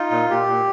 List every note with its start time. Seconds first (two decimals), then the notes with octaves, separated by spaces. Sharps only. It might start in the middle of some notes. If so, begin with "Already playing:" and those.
Already playing: D#4 F4
0.11 A#2
0.30 A#2 G4
0.48 A#2